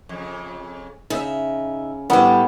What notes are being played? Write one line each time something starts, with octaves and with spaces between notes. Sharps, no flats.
F2 C#3
C#3 D#4 D#5 E5
A2 G3 B3 C#4 D4 A4